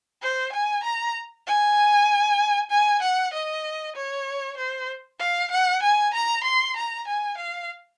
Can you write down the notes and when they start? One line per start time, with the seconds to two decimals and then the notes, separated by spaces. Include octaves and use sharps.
0.22 C5
0.53 G#5
0.84 A#5
1.47 G#5
2.71 G#5
3.02 F#5
3.33 D#5
3.96 C#5
4.57 C5
5.19 F5
5.51 F#5
5.82 G#5
6.14 A#5
6.44 C6
6.76 A#5
7.07 G#5
7.38 F5